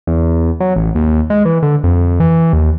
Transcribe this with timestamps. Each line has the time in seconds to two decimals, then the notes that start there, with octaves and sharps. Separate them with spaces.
0.07 E2
0.60 F#3
0.76 A1
0.95 D#2
1.30 G#3
1.45 E3
1.63 D3
1.84 F2
2.20 E3
2.53 D#2